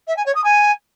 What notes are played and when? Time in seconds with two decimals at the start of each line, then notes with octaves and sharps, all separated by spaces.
0.08 E5
0.17 G#5
0.26 C#5
0.35 D#6
0.44 G#5